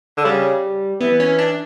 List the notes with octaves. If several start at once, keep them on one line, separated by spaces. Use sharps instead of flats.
D3
C#3 G3
E3 B3
C#4
D4